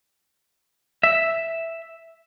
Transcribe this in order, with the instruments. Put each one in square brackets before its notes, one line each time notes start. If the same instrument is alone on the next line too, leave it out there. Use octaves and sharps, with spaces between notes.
[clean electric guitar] E5